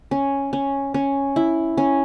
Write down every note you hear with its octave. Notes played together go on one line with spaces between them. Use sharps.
C#4
C#4
C#4
E4
C#4